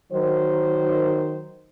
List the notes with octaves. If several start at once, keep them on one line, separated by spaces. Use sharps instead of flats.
D#3 F#3 C5